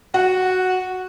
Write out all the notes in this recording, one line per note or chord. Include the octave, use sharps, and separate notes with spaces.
F#4 F#5